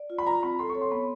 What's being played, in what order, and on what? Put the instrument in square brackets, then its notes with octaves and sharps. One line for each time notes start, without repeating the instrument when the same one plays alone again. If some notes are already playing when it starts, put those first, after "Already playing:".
Already playing: [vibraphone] D5
F4
[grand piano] B5
[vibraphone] F4 [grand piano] A#5
[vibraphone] C4 [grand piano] B5
[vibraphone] A4 [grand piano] C6
[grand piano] C#6
[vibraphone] C#5
[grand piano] C6
[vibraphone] B3 [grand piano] B5